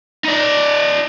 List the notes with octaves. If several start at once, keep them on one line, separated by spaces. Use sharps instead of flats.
D#4 D5